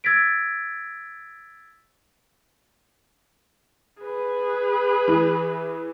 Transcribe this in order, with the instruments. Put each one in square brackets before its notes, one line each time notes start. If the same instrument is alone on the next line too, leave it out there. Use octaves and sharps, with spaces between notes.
[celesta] E6 G#6 A6 B6 D7
[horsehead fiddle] G#4 B4
[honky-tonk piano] E3